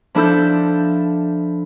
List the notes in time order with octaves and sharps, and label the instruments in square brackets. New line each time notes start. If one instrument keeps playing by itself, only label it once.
[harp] F3 D4 E4 A4 E6 G6